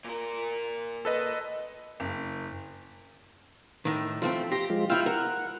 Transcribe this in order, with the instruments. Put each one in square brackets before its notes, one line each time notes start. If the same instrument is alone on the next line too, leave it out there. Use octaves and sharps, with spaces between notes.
[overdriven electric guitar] A#2 A#4
[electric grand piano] A4 B4 D#5
[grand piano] F#1
[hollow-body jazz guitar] A2 D#3
[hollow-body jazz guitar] F3 A3 C4 [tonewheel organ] F4
[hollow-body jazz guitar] G4 [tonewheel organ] C6 A#6
[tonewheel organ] F3 G#3 F4
[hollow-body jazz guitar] E4 F4 [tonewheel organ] G5 E6 F6
[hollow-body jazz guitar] A#4 [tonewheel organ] F#5